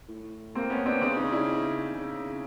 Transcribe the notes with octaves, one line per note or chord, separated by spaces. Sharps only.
A2
A#3 C4
B3 C#4
C4 D4
C#3 C4 D4
C#4 D#4
D4 E4
C#3